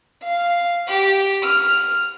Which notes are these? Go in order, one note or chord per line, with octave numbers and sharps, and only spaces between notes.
F5
G4
F6